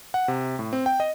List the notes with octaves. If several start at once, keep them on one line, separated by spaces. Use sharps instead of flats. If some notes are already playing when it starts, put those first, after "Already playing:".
F#5
C3
A2
C4
G5
D#5